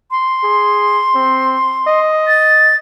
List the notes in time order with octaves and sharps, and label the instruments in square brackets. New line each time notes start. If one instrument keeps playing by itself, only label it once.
[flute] C6
[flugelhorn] G#4
C4
D#5
[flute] A6